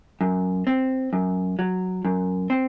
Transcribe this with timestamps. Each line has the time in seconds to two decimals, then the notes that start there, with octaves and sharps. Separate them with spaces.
0.21 F#2
0.67 C4
1.13 F#2
1.59 F#3
2.05 F#2
2.50 C4